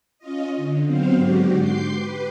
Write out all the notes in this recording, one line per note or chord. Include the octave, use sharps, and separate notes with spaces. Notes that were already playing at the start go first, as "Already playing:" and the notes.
C#4 F4 D#5
D3
F#3 B3 C4 C5 F5
G#2 D3 F#4 G4
C6 D6 G6 C7
G4 B4